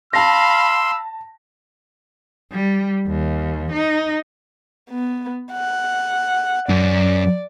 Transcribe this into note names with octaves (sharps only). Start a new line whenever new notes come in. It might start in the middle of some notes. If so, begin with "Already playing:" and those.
F5 A5 B5 C6 E6 A#6
G3
D#2
D#4
B3
F#5
F#2 D5